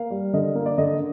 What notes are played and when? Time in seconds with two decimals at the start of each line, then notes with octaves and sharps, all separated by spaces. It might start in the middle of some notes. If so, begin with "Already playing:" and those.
Already playing: A#3 F5
0.11 G3
0.33 D3 D#5
0.55 A#3
0.66 D5
0.78 D3 D#5